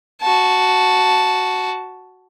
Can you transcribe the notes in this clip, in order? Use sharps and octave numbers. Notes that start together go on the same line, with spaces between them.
F#4 A5